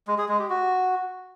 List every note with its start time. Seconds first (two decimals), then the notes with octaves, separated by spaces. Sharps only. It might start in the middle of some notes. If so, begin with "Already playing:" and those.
0.08 G#3
0.18 G#4
0.29 G#3
0.39 G4
0.50 F#4